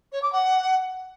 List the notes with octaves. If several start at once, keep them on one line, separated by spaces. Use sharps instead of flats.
C#5
D6
F#5